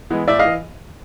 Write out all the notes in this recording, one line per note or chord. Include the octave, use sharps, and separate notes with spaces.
E3 G#3 B3
A2 D5 E5
D#5 F5
E3